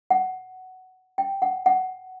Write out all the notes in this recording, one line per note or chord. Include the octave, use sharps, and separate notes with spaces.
F#5
G5
F#5
F#5